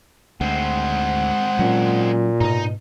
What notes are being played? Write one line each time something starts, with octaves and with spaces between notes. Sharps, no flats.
D2 G#3 C4 F#5
A#2 F#3 C#4
G#2 B2 D#4 A#5